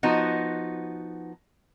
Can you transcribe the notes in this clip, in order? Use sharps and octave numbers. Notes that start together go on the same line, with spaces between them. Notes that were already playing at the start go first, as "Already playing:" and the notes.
F3 B3 D#4 F#4